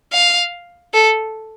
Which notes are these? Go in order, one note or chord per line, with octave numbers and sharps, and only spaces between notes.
F5
A4